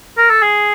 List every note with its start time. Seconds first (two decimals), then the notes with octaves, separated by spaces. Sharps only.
0.18 A#4
0.30 A4
0.42 G#4